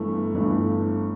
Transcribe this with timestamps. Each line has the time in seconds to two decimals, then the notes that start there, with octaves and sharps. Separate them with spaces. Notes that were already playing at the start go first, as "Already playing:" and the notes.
Already playing: G1 G2 E3 A3
0.34 G1 G2 E3 A3